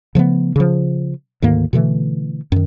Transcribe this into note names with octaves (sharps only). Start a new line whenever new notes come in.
C#3 F3 A3 B3
C#3 F3
D2 G#2 D#3 A#3
B2 D3 E3 A3
F#2 D#3